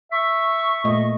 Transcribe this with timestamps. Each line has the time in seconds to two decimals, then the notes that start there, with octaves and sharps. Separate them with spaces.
0.12 E5 C#6
0.84 A#2 A3 D#5